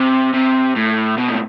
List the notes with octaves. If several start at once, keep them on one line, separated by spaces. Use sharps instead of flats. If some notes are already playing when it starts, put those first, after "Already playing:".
Already playing: C3
C3
A2
B2
A2